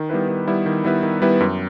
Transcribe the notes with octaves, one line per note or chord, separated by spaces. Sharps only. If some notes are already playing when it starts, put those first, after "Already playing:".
Already playing: D#3
G3 B3 E4 B4
D#3
G3 B3 E4 B4
D#3
G3 B3 E4 B4
D#3
G3 B3 E4 B4
F#2